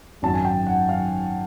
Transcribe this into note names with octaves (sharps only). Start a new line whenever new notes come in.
G#1 F#2 D#3 F#3 A5
G#5
G5
F#5
D#3 F#3 F5